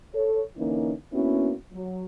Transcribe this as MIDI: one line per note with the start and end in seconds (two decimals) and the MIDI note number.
0.14 0.42 69
0.14 0.42 73
0.57 0.93 50
0.57 0.93 52
0.57 0.93 58
0.57 0.93 61
0.57 0.93 63
1.13 1.52 58
1.13 1.52 59
1.13 1.52 61
1.13 1.52 62
1.13 1.52 64
1.13 1.52 66
1.73 2.05 54